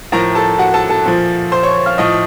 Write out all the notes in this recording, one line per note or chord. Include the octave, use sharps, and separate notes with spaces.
A2 F3 A#4 A#5
A4 A5
F#4 F#5
A4 A5
A4 A5
A#2 F3
C5 C6
C#5 C#6
F5 F6
A2 F3 D#5 D#6